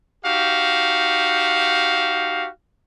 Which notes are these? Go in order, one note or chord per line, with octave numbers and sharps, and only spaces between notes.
D#4 F#4 G4 F5